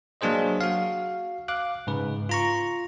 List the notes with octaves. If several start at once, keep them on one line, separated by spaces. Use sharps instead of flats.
F#3 A#3 D4 G#4 C5 D#5
F#4 F5
F5 D6 F#6
G#2 C#3 B4
F4 A#5 C#6